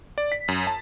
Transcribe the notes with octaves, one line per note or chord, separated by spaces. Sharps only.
D5
B6
F#2
A5